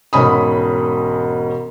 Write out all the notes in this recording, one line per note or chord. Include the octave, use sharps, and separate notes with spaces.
E1 G#2 C#4 B5 D#6